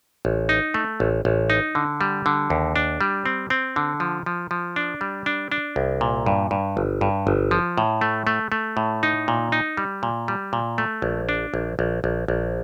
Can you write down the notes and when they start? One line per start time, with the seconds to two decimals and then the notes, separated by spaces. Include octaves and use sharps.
0.25 A1
0.49 D#4
0.74 A3
1.00 A1
1.25 A1
1.50 D#4
1.75 D3
2.01 G3
2.26 D3
2.50 D#2
2.76 D4
3.01 G3
3.26 C4
3.50 C4
3.76 D3
4.00 F3
4.26 F3
4.51 F3
4.76 D4
5.01 G3
5.26 D4
5.52 D4
5.76 C2
6.01 A#2
6.26 G2
6.51 G2
6.77 G1
7.01 G2
7.27 G1
7.51 F3
7.78 A2
8.01 A3
8.27 A3
8.52 A3
8.77 A2
9.03 D#4
9.28 A#2
9.52 D#4
9.77 G3
10.03 A#2
10.28 G3
10.53 A#2
10.78 A3
11.02 A#1
11.29 D4
11.54 A#1
11.79 A#1
12.04 A#1
12.28 A#1